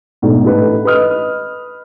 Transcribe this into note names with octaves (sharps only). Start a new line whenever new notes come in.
G#2 B2 A3 D4
A1 A2 D#4 A4 B4
B4 D#5 D#6 F6